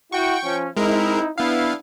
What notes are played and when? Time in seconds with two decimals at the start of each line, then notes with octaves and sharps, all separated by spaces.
0.12 E4 F#4 G5 C#6
0.44 F3 C#4
0.77 G#3 C4 D#4 E4 A#4
1.38 B3 D4 E4 F5